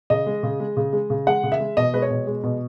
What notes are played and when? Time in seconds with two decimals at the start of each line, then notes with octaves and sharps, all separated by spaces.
0.10 C#3 D#5
0.26 G#3
0.43 C#3
0.60 G#3
0.77 C#3
0.93 G#3
1.10 C#3
1.27 G#3 F#5
1.43 C#3
1.52 E5
1.60 G#3
1.77 B2 D#5
1.93 G#3 B4
2.02 C#5
2.11 B2
2.27 G#3
2.43 B2